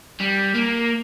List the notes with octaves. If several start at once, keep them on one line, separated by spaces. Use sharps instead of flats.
G3
A#3